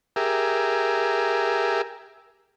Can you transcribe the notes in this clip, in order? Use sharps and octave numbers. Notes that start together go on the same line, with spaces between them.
G4 G#4 A#4 E5